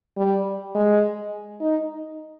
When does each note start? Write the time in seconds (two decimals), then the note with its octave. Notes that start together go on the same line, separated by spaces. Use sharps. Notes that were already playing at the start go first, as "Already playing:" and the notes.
0.17 G3
0.75 G#3
1.60 D#4